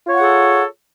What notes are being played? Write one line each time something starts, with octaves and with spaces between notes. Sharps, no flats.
F4 G#4 A4 C#5 F#5